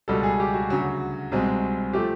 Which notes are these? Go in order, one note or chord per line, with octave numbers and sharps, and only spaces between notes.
C#2 B2 G3 A4
G#4
G4
F#4
D2 C#3 F#3
C2 B2 G#3 C4
F3 A3 G4